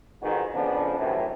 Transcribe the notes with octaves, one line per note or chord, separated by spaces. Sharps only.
F2 G#2 D#3 G#3 B3 F#4
F2 C#3 F3 B3 D4
F#2 A2 C3 D#3 E3